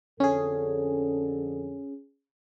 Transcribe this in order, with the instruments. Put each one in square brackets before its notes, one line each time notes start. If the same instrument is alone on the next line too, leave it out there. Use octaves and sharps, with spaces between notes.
[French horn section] F2 D3 A4 [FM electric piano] C#4 G#4